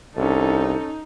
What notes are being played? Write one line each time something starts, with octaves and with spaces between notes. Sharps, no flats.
C2 C#4 D#4 A4